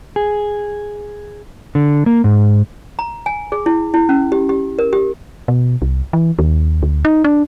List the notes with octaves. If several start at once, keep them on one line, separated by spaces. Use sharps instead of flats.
G#4
D3
A#3
G#2
A#5
G#5
G#4
E4
E4
C#4
G4
G4
A#4
G4
B2
C2
E3
D#2
D2
D#4
D4